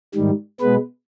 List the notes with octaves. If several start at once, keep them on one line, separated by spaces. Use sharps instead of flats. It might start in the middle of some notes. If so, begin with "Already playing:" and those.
G#2 D#3 G3
B2 G#3 B3 B4